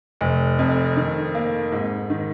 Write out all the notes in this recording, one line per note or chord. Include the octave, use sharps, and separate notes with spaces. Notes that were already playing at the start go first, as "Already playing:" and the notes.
F1
F2
D#3
A#3
G#2
D#3